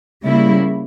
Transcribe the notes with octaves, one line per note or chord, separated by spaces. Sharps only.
C#3 G3 A#3 E4